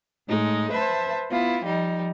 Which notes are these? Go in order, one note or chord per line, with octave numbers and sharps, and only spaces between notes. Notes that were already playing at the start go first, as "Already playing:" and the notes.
A2 G#3 D#4
B4 C5 E5 A5
B3 E4 F4
F3 G3 D#4